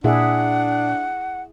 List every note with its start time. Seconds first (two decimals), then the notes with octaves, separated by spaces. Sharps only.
0.04 A#2 D4 E4 G#4 E5 F#5